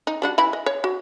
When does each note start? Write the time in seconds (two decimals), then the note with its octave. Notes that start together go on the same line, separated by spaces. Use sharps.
0.07 D#4
0.22 G3 D4 F#4
0.38 E3 E4 B5
0.53 D#5
0.66 C#5
0.84 F#4